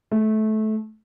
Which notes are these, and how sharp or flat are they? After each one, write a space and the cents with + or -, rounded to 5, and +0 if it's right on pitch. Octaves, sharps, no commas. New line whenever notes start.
A3 -20